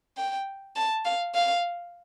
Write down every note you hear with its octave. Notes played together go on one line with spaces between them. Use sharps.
G5
A5
F5
F5